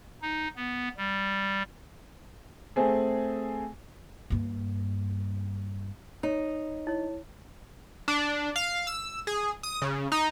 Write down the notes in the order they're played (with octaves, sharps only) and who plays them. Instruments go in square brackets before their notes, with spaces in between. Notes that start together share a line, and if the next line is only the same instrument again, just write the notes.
[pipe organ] D#4
B3
G3
[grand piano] A3 C4 G#4
[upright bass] G2 A#3
[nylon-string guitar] D#4 [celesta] C#5
[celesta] E4 C#5
[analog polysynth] D4
F5
E6
G#4
D#6
C#3
D#4